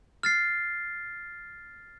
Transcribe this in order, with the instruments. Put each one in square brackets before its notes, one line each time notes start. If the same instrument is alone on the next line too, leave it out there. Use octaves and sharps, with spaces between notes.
[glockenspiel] F6 A6 C7